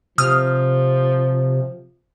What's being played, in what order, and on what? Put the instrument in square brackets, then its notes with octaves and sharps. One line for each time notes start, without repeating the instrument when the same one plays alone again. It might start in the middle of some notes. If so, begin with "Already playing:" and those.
[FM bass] C3 [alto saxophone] F3 [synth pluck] D#6 F6